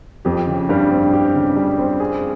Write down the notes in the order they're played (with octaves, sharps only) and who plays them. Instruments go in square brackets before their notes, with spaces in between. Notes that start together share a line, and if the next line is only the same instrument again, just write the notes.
[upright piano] F2 [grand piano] G4
[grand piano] C#3
[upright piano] G2 [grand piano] G3
[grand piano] C4
G4
C#3
G3
C4
G#4